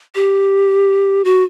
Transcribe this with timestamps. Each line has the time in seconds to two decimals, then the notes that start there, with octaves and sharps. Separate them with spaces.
0.15 G4
1.25 F#4